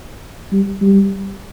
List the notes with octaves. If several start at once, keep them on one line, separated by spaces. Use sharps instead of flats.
G3
G3